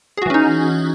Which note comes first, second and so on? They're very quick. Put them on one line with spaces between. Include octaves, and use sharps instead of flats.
G#4 F#4 E3 C#4 D#4